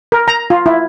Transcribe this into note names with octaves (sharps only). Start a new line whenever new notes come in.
A#4
A#5
F4
E4